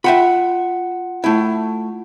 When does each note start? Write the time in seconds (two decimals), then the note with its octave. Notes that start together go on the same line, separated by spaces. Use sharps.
0.04 F4 E5 F#5 G5 B5 C#7
1.24 A3 E4